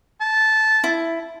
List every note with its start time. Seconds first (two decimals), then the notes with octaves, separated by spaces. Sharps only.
0.21 A5
0.84 E4